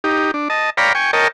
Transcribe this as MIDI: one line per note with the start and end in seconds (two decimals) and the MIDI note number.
0.04 0.31 63
0.04 0.31 67
0.34 0.48 62
0.50 0.70 75
0.50 0.70 81
0.77 0.93 73
0.77 0.93 74
0.77 0.93 77
0.77 0.93 79
0.77 0.93 82
0.77 0.93 83
0.95 1.11 79
0.95 1.11 80
0.95 1.11 85
1.13 1.28 70
1.13 1.28 73
1.13 1.28 75
1.13 1.28 79
1.13 1.28 81